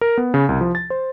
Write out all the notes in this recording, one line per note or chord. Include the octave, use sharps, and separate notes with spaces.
A#4
B3
C#3
C2
F3
A6
C5